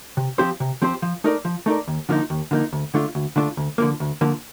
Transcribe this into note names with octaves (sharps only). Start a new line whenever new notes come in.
C3
F3 C4 G4 C5
C3
F3 C4 G4 C5
F3
A3 D#4 A#4 D5
F3
A3 D#4 A#4 D5
D#2
D3 F3 A#3 D#4
D#2
D3 F3 A#3 D#4
D2
D3 A3 D4 F4
D2
D3 A3 D4 F4
D2
D3 F3 A#3
D2
D3 F3 A#3